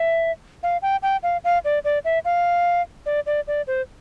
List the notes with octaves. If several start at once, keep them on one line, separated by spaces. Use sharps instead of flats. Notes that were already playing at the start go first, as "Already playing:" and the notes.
Already playing: E5
F5
G5
G5
F5
F5
D5
D5
E5
F5
D5
D5
D5
C5